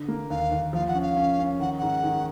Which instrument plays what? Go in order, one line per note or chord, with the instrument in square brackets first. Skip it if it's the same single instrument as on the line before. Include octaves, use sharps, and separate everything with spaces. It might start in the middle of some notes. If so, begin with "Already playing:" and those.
Already playing: [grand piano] D3
A#3
[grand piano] D#2 [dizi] F5
[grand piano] D#2
[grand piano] F3 [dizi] F5
[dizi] F#5
[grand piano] C#4
[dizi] F5
[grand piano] C#4
C#4
[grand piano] D#3 [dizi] F#5
[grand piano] G#2 [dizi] F#5
[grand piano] D#3